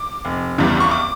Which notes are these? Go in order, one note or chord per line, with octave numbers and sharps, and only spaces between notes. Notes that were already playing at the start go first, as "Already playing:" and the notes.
Already playing: D6
F1
E2 C#3 E3 G3
C#6
D6